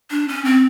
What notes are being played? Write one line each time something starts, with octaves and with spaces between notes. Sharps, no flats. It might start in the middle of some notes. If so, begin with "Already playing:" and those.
D4
C#4
C4